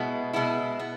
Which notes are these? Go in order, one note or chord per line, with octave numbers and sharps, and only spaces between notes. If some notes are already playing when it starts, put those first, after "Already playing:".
Already playing: B2 G#3 B3 E4
B2 G#3 B3 E4
B3